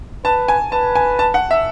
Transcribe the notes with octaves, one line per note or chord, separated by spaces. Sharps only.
B4 A5
G#5
B4 A5
G#5
A5
F#5
E5